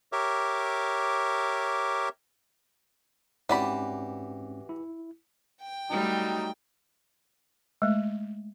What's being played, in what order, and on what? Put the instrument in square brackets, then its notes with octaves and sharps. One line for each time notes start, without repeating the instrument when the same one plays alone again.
[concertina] G4 A#4 C#5 E5 D6
[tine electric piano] G#2 C4 C#4 [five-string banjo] E3 D5 B5 [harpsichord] F#4 G4
[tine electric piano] E4
[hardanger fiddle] G5
[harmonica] F#3 D#4 [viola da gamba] G3 A3
[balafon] G#3 A3